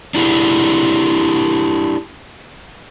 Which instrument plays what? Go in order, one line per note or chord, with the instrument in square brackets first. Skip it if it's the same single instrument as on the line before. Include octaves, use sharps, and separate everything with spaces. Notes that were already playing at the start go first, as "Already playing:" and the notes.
[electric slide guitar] D4 E4 G4 G#4